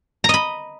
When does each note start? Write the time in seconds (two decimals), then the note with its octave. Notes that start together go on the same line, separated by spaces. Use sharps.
0.24 A#5
0.29 D#5
0.34 B5